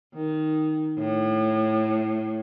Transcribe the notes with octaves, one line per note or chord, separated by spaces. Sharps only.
D#3
A2